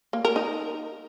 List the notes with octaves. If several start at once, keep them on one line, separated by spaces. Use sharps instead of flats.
A#3
A#4
D#4